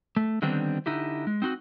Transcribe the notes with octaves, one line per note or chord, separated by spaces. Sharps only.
A3
D3 D#3 G3 B3 C4 D4
D3 D#4 E4 G4
G#3
C4 D#4 F4 F#4